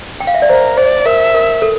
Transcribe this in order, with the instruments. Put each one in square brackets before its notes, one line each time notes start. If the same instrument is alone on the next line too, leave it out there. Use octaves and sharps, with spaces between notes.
[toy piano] G5
F5
E5
D5
[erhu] A#4 [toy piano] C5
[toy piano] C5 [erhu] D5
[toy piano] A#4 [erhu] E5
[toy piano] A#4
A4